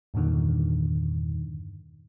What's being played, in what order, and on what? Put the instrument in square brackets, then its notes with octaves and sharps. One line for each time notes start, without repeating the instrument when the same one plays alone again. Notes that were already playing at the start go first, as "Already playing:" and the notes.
[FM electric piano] E2 G2 A#2 D3 D#3